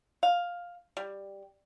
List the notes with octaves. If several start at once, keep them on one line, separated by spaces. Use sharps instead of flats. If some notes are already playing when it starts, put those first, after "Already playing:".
F5
G3